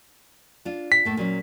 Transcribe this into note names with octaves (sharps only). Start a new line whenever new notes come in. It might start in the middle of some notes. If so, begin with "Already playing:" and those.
D4 F4
B6
A2 A3 A#3
A#2 F#3 C#4